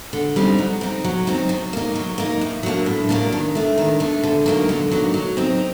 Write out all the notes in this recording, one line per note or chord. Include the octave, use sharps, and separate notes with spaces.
D3
G3 C4 D#4
F#3
C4 D#4
F#3
C4 D#4
F#3
A#3 D#4
F#3
A#3 D#4
A2
F#3 A#3 D4
A2
F#3 A#3 D4
D#3
A3 D4
D#3
A3 D4
D3
F#3 A#3 D#4
D3
F#3 A#3 D#4
F#3
C4 D#4